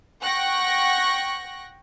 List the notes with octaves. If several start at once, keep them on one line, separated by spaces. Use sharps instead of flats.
F#5 G5 C#6 F#6 A#6